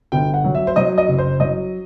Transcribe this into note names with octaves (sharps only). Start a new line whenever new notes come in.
G1 G5
F#5
F#3
E5
C5
F#3 D#5
D#5
F#1
C5
F#3 D#5